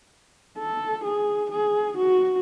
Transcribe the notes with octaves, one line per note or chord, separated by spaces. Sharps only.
A4
G#4
G#4
F#4